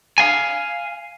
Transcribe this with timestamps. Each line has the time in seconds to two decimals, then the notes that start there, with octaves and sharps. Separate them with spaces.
0.18 F5 G#5